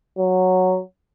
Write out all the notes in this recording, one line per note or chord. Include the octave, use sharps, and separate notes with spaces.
F#3